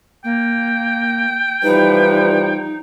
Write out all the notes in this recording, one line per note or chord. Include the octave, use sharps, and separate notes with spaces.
A#3 G5
E3 F3 G3 D#4 B4